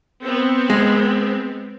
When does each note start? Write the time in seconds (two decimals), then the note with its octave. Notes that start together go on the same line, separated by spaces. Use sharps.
0.21 B3 C4
0.70 G#3